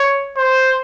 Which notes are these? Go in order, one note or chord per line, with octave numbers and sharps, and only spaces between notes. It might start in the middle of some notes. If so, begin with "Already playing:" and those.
Already playing: C#5
C5